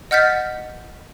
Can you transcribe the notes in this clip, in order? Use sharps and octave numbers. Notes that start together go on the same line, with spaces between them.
D#5 F#5 F6 G6 A6 B6